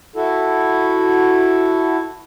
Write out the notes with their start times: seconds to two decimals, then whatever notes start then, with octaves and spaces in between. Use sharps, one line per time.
0.16 E4 F#4 A4